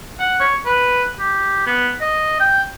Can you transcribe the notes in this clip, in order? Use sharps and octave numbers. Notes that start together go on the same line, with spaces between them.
F#5
C#5
B4
G4
B3
D#5
G5